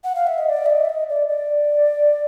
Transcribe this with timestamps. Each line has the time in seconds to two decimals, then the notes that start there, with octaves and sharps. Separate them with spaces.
0.04 F#5
0.15 F5
0.27 E5
0.38 D#5
0.49 D5
0.66 E5
0.70 D#5
0.85 E5
0.90 D#5
1.09 D5
1.28 D5